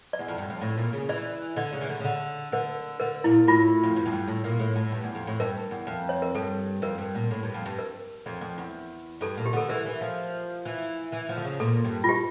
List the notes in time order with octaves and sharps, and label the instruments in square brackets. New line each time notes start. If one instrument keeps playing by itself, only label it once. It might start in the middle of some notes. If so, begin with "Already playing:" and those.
[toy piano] D5
[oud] E2
F2
G2
F2
A2
A#2
C#3
[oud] E3 [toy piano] D5
[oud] D3 [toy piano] D5
[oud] C#3
E3
D3
C#3
D3
[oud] D3 [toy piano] A#4
[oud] D3 [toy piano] A#4
[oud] A#2 [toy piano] E4
[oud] A2 [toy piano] F4
[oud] F2
G2
F2
G2
A2
A#2
A2
A2
G2
E2
F2
A2
[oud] G2 [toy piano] A#4
[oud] E2
F2
[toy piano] C#5
A#4
[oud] G2 [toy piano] A4
[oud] F2 [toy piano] A#4
[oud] G2
A#2
A2
G2
F2
G2
[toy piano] A#4
[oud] F2
F2
E2
[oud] G2 [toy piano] A4
[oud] A#2
[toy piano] G4
[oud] D3 [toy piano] A4
[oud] E3 [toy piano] A#4
[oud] E3
F3
E3
E3
F3
D3
C#3
[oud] A#2 [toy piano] A4
[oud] G2
[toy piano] F4
G4